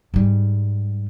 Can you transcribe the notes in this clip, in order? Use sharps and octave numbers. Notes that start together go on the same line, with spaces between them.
G#2 G3